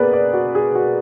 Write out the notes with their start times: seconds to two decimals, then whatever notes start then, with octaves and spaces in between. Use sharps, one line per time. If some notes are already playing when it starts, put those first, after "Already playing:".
Already playing: B2 A#3 B3 G#4 B4 D5
0.13 D5
0.33 F#4
0.55 G#4
0.75 F#4